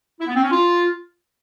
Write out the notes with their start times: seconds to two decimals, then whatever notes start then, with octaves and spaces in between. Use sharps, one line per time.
0.20 E4
0.27 B3
0.35 C4
0.43 C#4
0.51 F4